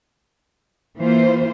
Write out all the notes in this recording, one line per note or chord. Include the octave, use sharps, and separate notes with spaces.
E3 A#3 F4 C5